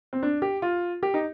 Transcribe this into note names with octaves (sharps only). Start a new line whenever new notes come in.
C4
D4
G4
F4
G4
D#4